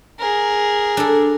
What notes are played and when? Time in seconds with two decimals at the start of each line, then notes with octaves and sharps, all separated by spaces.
0.20 G#4 A#4
0.97 D4 A4